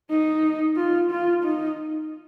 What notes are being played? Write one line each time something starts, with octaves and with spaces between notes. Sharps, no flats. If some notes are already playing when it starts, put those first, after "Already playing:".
D#4
F4
F4
D#4